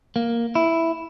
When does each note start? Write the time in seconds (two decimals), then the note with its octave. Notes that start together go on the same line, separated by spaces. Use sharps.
0.16 A#3
0.55 E4